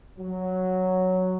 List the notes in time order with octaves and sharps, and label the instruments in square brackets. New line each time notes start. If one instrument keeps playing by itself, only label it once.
[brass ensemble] F#3